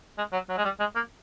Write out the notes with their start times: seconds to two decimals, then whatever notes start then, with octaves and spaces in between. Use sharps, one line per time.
0.18 G#3
0.32 F#3
0.49 F#3
0.58 G#3
0.64 G3
0.80 G#3
0.95 A#3